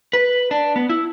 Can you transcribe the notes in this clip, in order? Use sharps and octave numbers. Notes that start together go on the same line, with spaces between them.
B4
D4
B3
E4